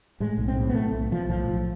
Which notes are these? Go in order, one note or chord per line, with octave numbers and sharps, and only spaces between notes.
A2 G#3
B1
C4
A2
B3
B1 A3
B1
B1 F3
A2 F3
B1